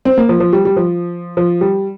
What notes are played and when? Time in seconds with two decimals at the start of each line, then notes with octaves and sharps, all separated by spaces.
0.05 C4
0.18 A#3
0.29 F3
0.40 F3
0.53 G3
0.65 G3
0.77 F3
1.37 F3
1.61 G3